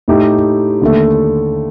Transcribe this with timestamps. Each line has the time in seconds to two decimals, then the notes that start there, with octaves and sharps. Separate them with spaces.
0.08 A2 A3 D#4 G4
0.82 D#2 D3 A3